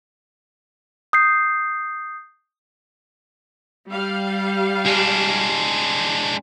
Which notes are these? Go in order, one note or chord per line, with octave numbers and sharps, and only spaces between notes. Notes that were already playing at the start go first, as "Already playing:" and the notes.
D#6 G6 C7
G3 F5
G#3 D4